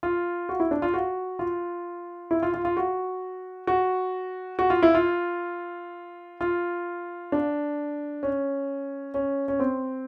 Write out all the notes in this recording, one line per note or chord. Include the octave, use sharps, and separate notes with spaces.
F4
F#4
E4
D4
F4
F#4
F4
E4
F4
F4
F4
F#4
F#4
F#4
F4
E4
F4
F4
D4
C#4
C#4
C#4
C4